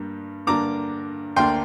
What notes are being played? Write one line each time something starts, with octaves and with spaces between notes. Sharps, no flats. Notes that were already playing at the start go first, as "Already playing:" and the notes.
Already playing: G2 G3 A#3
G2 D3 A#3 D4 A#5 D6
D2 D3 A#3 D4 G5 C6